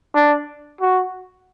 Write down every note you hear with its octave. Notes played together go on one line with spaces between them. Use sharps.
D4
F#4